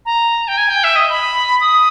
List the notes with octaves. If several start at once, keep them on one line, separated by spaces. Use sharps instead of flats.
A#5
G5
G#5
G5
E5
D#5
B5
D#6